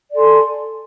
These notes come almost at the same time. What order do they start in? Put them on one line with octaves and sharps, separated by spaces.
D5 A4 G#5 C6